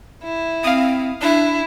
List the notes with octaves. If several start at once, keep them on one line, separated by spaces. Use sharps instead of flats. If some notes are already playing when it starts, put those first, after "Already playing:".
E4
C4 F5 D#6
D4 E4